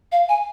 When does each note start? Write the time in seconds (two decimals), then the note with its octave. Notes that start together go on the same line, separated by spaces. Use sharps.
0.12 F5
0.29 G#5